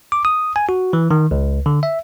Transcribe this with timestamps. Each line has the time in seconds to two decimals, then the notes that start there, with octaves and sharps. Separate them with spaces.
0.12 D6
0.25 D#6
0.56 G#5
0.69 F#4
0.93 E3
1.11 D#3
1.31 C#2
1.66 D3
1.83 E5